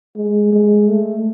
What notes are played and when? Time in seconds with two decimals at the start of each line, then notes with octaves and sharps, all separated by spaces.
0.16 G#3
0.52 G#3
0.88 A3